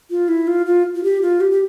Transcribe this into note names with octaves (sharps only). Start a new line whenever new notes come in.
F4
E4
F4
F4
F4
G4
F4
G4
G4